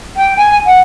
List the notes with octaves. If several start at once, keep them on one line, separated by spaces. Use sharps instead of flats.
G5
G#5
F#5